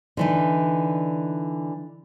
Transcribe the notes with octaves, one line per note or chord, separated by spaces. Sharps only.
D3 E3 D#4